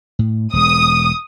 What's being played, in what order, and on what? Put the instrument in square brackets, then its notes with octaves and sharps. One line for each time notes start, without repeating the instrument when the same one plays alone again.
[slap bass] A2
[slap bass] E1 G#3 [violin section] D#6